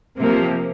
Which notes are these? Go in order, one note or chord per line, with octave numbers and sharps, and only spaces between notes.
C3 F3 A#3